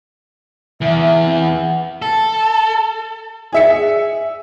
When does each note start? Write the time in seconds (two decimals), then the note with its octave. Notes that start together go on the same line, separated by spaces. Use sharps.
0.81 E2 E5
1.23 C4
1.37 F#5
2.02 A4
3.52 G#4 E5 C#7